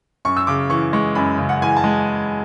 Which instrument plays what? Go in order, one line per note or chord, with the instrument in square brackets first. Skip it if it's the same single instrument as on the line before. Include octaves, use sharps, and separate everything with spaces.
[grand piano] F#2 [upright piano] C#6
[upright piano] E6
[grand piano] C#3 [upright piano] D6
[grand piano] E3 [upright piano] C#6
[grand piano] G#3 [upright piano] C#6
[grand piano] F#2 [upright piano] B5
[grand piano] C#3
[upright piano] F#5
[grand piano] E3 [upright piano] G#5
[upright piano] A5
[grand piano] G#3